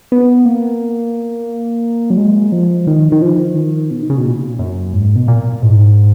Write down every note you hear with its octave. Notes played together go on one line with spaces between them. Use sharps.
B3
A#3
F#3
G#3
F3
D#3
D#3
F3
D#3
B2
D#3
C#3
B2
A#2
F#2
G#2
B2
A#2
G#2